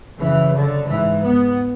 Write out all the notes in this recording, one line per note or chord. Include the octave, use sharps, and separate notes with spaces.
F#2 C#3 E3
D3
G#2 E3
B3